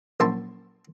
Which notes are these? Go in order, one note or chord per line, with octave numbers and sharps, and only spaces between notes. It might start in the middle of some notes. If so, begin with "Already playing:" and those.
A#1 F#2 E4 E5 A5 C6